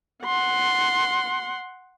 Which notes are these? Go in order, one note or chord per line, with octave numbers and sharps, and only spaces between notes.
F#5 C6